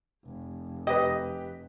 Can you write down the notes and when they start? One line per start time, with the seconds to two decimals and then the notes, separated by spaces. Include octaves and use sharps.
0.24 F1
0.87 G4 B4 D#5